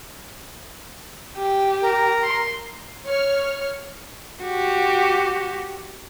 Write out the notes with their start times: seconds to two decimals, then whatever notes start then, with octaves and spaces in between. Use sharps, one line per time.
1.37 G4
1.82 A#4
2.23 C6
3.05 C#5 F6
4.43 F#4 G4